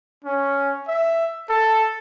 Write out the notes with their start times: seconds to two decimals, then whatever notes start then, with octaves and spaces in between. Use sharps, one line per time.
0.24 C#4
0.88 E5
1.49 A4